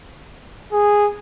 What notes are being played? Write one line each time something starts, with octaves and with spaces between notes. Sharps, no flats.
G#4